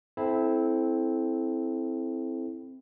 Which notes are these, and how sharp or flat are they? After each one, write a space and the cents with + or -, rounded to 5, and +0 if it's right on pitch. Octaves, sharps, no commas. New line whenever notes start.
C4 +0 E4 +0 A4 -20